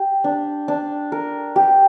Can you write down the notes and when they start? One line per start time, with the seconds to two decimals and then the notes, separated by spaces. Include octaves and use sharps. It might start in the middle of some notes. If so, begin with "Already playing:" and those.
Already playing: G4
0.24 D4
0.68 D4
1.12 A#4
1.56 G4